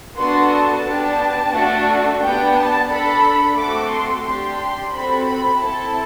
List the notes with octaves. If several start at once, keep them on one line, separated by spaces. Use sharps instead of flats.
B3 D4 F#4 A4 C6
A5
B3 D4 G4
A3 D4 F#4
B3 D4 G4 G5
A5
D4 A4 B5
A3 C4 F#4 A4 D6
C6
D4 G4 C6
C6
C4 F#4 A4 B5
B5
C4 E4 A4 A5